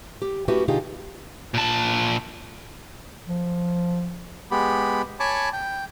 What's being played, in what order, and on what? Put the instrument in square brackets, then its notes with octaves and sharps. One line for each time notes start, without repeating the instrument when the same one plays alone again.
[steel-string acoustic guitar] G4
A3 C#4 E4 F#4 G4 B4
B2 D3 D#4 F4 G4 G#4
[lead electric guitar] A#2 A5
[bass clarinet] F3
[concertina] G#3 B3 G4 B5
C#5 G#5 A5 B5 C#6 D6
G5